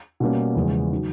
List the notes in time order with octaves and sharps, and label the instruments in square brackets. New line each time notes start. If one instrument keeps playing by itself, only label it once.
[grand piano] B2 G3 A#3 C#4
E2 C#3 F3 G#3
D#3 F#3